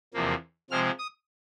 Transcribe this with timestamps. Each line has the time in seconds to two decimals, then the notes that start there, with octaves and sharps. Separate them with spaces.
0.14 E2 C3 F3 A#3
0.70 C3 F3 G#3 C4 F6
0.99 D#6